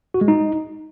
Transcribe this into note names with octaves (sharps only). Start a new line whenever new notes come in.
F#4
G#3
D#4